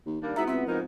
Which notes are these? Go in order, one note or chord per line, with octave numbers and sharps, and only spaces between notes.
D#2
D#2 G3 A#3 D4
G#2 B3 E4 F#4 E5 A#5
C#2 C4 E5
G#2 F3 B3 D#4 A#4